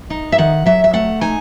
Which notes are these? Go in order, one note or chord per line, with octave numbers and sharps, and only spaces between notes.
D#4
E5
D#3 F#5
F#3 E5
E5
A3 F#5
D#4 G#5